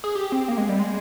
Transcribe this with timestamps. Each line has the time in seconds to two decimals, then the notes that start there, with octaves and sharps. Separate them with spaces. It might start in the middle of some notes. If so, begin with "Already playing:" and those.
0.04 G#4
0.15 G4
0.32 C4
0.48 A#3
0.58 G#3
0.69 G3
0.79 G#3